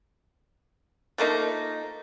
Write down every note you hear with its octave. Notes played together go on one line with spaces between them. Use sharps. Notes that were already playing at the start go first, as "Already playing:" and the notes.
F3 A3 A#3 D#4